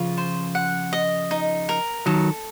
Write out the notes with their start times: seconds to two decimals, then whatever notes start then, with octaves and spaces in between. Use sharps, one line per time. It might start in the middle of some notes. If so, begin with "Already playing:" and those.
Already playing: C#3 F3 F4
0.18 C5
0.55 F#5
0.93 D#5
1.31 D#4
1.69 A#4
2.06 D#3 F#3 A4